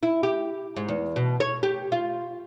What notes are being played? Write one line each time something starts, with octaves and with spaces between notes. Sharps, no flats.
E4
G4
G#2
E2
B2
C#5
G4
F4